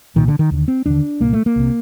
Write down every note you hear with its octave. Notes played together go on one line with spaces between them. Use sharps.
C2 A#2 D#3
D3
D#3
D#2 D3
C4
D#2 D3 D4
C2 A#2 A#3
A3
A#3
C2 C3